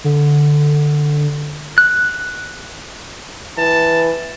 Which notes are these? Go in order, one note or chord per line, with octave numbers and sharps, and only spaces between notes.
D3
F#6
E3 A5